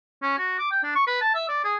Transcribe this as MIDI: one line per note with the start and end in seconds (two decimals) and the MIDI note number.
0.22 0.38 61
0.38 0.58 66
0.59 0.69 86
0.71 0.79 79
0.83 0.95 62
0.95 1.07 85
1.07 1.17 71
1.21 1.30 81
1.34 1.45 76
1.49 1.61 74
1.64 1.76 68